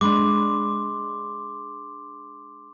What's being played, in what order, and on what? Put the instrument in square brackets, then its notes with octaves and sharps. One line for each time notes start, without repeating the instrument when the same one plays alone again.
[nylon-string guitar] G#3 D4 [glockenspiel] B5 C6 D6